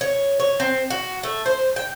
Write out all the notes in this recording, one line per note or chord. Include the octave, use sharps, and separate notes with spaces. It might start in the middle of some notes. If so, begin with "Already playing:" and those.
C#5
C#5
C4
F#4
A3
C5
G5